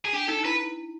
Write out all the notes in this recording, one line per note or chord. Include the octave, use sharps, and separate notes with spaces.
G#4
D4 G4
D#4 A4
E4 B4